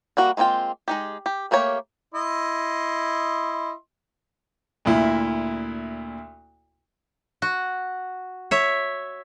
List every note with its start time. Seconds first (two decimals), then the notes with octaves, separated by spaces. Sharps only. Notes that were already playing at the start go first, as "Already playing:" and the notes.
0.17 G3 A#3 F#4 F#5
0.37 G#3 A#3 C4 F4 G5
0.88 G#3 D#4 G4
1.26 G4
1.51 A3 A#3 G4 C#5 F5
2.14 E4 D#5 C6
4.85 D2 A#2 E4
7.42 F#4
8.51 C#5 E5